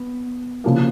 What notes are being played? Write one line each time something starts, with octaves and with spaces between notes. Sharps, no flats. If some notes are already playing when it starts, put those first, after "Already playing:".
Already playing: B3
C#3 F3 A#3